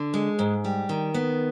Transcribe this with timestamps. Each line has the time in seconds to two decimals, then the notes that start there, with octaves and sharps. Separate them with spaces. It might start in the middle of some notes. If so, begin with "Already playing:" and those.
Already playing: D3
0.14 G#3
0.39 G#2
0.65 G3
0.89 D#3
1.14 B3